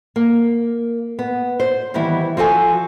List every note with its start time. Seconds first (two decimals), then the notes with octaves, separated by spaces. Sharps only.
0.16 A#3
1.19 B3
1.60 C5
1.94 D#3 E3 G3 B3 E4
2.37 F3 F#4 A4 G#5